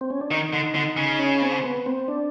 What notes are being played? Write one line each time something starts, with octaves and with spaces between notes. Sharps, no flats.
C4
C#4
D4
D#3 D#4
D3
D3
C#3
C#4
C4
B3
C4
D4